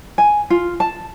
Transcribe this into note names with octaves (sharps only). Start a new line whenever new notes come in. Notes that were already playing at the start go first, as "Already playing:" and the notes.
G#5
F4
A5